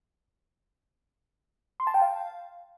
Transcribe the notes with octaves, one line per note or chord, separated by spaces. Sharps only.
C6
A5
G5
F5